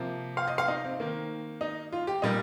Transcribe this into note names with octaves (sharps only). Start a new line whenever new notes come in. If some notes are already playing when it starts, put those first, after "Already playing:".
Already playing: C3 F3 A#3
F5
D#5
F5
D#4
C4
D#3 A#3
D#4
F4
G4
A#2 G3 A#3 D#4